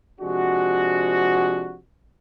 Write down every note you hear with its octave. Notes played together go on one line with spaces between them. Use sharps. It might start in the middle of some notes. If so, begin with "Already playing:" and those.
C3 F3 G#3 D4 F#4